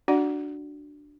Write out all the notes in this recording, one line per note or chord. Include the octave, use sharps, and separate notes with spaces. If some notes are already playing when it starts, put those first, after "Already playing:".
D4 F#4 D5 F#5